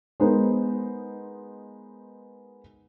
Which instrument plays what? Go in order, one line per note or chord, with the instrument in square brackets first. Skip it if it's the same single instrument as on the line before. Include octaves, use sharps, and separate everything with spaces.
[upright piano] G#3 B3 D#4 A#4 C5